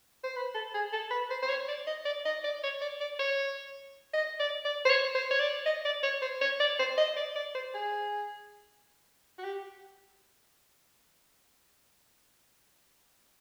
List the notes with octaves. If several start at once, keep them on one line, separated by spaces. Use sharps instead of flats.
C5
B4
A4
G#4
A4
B4
C5
C5
C#5
D5
D#5
D5
D#5
D5
C#5
D5
D5
C#5
D#5
D5
D5
C5
C#5
C5
C#5
D5
D#5
D5
C#5
C5
C#5
D5
C5
D#5
D5
D5
C5
G#4
F#4
G4